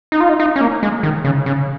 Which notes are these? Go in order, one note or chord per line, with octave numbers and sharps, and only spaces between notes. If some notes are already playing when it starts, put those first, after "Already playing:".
D#4
F4
D#4
D#4
C#4
A#3
G#3
D#3
C#3
C#3